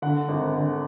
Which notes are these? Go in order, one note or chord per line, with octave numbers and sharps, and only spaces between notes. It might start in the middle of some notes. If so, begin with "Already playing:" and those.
D3 F#5
G#1
D3